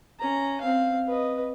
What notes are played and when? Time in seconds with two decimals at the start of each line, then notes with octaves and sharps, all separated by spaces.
0.19 C#4 A#5
0.61 C4 F5
1.07 B4 D#5